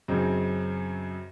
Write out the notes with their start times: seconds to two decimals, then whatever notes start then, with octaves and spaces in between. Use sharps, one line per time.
0.08 F#2 C#3 C4 D#4